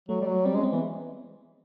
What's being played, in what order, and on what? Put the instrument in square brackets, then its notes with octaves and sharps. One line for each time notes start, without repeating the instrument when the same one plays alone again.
[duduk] F#3 [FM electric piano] A3
[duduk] G3
F#3
[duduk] G3 [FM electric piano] C4
[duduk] G#3 [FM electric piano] C#4
[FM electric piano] C4
[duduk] E3 [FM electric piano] B3